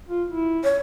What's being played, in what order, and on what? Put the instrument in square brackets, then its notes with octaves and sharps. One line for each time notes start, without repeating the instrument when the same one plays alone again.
[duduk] F4
E4
[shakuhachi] C#5